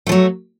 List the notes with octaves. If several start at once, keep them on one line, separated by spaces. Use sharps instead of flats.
F3 F#3 A3